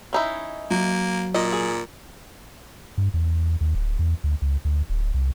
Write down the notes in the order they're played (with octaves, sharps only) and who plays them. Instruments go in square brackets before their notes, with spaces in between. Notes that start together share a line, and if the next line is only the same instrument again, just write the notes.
[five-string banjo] C#4 D#4 E4
[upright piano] F#3 [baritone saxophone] A#3
[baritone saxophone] A#2 [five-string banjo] D#5
[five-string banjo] G#4
[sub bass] G2
E2
D#2
D1
E2
D2
C#2
D2
D1
C2